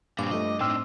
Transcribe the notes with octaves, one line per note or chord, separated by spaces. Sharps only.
G2 A#2 C4 D6
F3 A3 D#5
A2 C4 D4 D#4 G5 C6 E6 F6